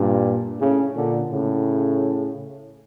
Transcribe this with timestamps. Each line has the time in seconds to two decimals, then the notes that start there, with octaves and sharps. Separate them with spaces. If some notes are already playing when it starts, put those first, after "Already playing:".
Already playing: G2 A#2
0.60 A2 C#3
0.96 A#2 D3
1.32 A2 C#3